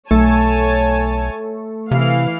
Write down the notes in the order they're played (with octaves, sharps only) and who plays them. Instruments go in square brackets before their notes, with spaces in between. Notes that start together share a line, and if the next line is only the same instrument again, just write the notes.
[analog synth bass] B1 [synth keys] A3 [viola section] C#5 G#5 A5
[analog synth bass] C3 [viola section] E3 F5